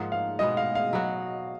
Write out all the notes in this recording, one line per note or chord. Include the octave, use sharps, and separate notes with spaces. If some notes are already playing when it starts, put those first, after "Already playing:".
Already playing: G#2 F3 A#3 D#4 F#5
F5
B2 G#3 B3 D#5
F5
F5
F#3 B3 F#4